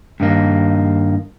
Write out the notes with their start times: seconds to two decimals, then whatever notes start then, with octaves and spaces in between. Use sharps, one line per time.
0.20 G2 D#3 A#3